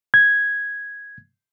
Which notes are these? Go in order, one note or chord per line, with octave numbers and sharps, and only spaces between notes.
G#6